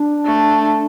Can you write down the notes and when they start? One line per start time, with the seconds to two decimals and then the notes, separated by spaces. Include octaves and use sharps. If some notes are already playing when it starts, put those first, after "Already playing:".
Already playing: D4
0.26 A3